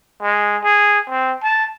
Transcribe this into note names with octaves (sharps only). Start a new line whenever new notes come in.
G#3
G#4
C4
A5